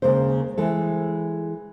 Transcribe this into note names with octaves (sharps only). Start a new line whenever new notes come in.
D#2 C#3 G#3 A#3 C5
E3 G#3 A4